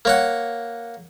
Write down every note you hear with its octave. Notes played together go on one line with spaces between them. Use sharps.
A#3 C#5 F#5